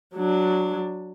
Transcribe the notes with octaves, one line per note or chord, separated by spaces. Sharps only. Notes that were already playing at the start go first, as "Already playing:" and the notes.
F#3 D4